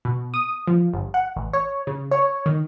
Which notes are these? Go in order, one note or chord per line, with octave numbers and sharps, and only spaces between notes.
B2
D#6
F3
G1
F#5
A1
C#5
C#3
C#5
D#3